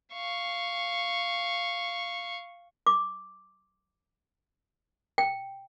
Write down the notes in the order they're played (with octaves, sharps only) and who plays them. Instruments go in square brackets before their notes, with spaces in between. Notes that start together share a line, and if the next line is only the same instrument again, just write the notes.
[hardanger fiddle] F5 C#6
[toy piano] D6
G5